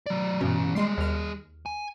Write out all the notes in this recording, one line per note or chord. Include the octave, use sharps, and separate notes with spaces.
F#3 D5
G2 B2 E3 C#4
G3 G#3 G#4 C6 C7
D#2 F6
G#5